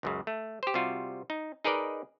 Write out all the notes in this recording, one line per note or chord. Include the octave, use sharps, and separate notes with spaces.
C#2 F#2 C#3
A3
G4 C5
C3 G3 F4 F#4
D#4
D#4 G#4 A#4 B4 D5 D#5